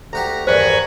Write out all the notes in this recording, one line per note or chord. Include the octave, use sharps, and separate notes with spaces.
D2 F#4 G4 A#5
E2 G2 D#3 C5 D5 G#5 B5 C#6